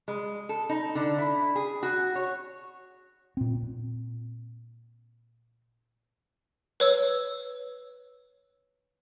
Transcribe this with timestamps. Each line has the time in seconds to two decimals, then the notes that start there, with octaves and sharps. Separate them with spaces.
0.08 G#3
0.49 A4
0.69 D#4
0.95 D3
1.18 E4
1.55 G#4
1.83 F#4
2.15 C#5
3.37 A#2 C4
6.80 B4 C#5 E6